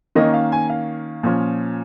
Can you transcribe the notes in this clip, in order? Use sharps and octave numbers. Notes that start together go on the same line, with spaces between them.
D#3 A#3 C#4 D#5
F5
G#5
F5
A#2 F3 C#4